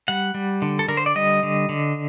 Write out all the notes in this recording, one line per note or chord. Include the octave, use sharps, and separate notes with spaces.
G3 F#5
G3
D3
A4
D3 A#4
C5
D5
G3 D#5
D3
D3